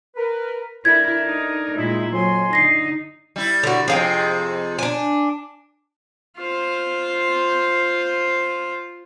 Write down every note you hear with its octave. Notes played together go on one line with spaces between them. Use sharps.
A#4 B4
D4 E4 A4 A#4 G#6
D#4
A#2 G#3 D#4 E4
F2 F#3 G#5 C6
D3 D#4 A#6 C7
G3 E4
D3 F#4
F2 C3 G#4 F5 G5
D4 G#5
F4 C5